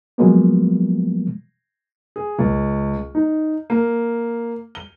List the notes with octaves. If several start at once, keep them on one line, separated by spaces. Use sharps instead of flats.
F3 F#3 G#3 A#3 B3
G#4
C#2
D#4
A#3
G7